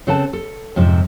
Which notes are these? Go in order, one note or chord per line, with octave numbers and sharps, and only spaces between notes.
C#3 C4 A4 B4 F#5 A5
A4
F2 G#2 C3 F3